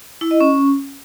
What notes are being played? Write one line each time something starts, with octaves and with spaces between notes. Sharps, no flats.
E4
D#5
C#4